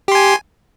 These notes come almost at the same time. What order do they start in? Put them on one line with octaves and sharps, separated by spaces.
G4 C6 G#5